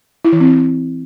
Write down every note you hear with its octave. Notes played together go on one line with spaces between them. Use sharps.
E4
E3
C4